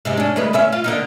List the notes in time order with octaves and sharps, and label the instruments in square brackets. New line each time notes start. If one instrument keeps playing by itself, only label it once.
[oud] G#2 C3 G#3
C#4 D4
D2 G#3 B4
D2 C#4 E5
F4
D3 A#3 D#4